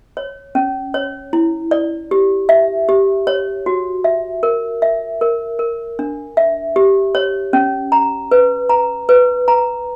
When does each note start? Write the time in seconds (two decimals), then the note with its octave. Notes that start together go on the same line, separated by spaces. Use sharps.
0.17 C#5
0.55 C#4
0.94 C#5
1.33 E4
1.71 D5
2.11 G4
2.49 E5
2.89 G4
3.27 C#5
3.66 F#4
4.04 E5
4.43 A#4
4.82 E5
5.21 A#4
5.59 A#4
5.99 D4
6.37 E5
6.76 G4
7.15 C#5
7.53 C#4
7.92 A#5
8.31 B4
8.69 A#5
9.09 B4
9.48 A#5